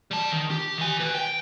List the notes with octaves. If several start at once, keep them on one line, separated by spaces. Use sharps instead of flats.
G3 A5
D#3
G4
D#3 G#5
B4 D#5
G5